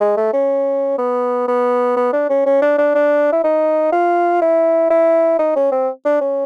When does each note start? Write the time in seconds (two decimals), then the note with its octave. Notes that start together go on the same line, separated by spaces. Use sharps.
0.01 G#3
0.17 A3
0.33 C#4
0.98 B3
1.48 B3
1.96 B3
2.13 D4
2.30 C#4
2.46 C#4
2.62 D4
2.78 D4
2.95 D4
3.32 E4
3.44 D#4
3.93 F4
4.41 E4
4.90 E4
5.39 D#4
5.56 C#4
5.72 C4
6.05 D4
6.21 C#4